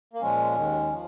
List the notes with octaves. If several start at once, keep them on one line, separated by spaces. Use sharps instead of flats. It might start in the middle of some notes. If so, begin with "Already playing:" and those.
A#3
A#2 F3 G#3 C#4
D#2 D#3 G#3
F3